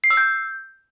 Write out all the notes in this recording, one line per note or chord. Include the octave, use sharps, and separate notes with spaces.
C7
E6
G6